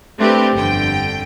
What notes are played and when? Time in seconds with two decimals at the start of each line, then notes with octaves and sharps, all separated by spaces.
0.18 A3 C4 D4 G4 B4
0.54 G1 F2 D3 G5